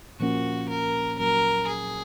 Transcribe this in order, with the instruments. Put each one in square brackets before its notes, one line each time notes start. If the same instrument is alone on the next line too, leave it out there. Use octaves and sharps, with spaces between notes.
[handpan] A#2 F3 A#3 C#4 [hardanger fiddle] F#4
[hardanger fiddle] A#4
[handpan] A#2 F#3 C#4 [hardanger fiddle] A#4
[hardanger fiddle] G#4